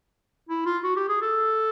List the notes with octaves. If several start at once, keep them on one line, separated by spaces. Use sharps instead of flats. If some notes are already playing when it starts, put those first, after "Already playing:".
E4
F4
F#4
G4
G#4
A4